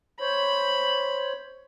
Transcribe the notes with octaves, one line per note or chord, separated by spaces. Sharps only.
C5 C#5 B5